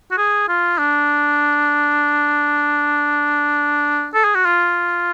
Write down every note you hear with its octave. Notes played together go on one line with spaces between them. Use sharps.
F#4
G#4
F4
D4
A4
G#4
F#4
F4